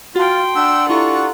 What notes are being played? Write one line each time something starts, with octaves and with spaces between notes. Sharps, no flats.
F4 F#4 G5 A5 C6
D4 F#5 E6
E4 F4 G4 A4 A#5 C#6